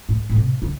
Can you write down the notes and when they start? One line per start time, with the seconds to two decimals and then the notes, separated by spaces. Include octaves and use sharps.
0.09 A2
0.30 A2
0.36 C3
0.62 D3